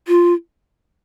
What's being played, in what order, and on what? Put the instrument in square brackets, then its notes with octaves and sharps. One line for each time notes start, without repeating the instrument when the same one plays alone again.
[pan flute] F4